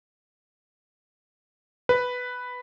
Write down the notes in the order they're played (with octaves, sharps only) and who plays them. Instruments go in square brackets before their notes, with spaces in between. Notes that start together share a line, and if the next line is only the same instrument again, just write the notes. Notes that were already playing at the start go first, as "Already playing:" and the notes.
[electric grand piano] B4